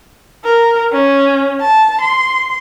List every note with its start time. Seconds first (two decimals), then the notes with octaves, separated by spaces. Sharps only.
0.45 A#4
0.92 C#4
1.61 A5
2.01 C6